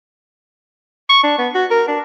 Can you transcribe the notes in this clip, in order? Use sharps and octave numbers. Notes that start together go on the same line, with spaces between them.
C#6
D4
B3
F#4
A#4
D4